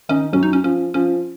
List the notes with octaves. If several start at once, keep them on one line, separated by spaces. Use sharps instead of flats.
D#3 C#4 D#4
F#2 F#3 C#4
D#4
C#4
F3 C#4
F3 C#4